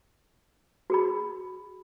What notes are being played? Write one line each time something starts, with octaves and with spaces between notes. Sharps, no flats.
F#4 G#4 B5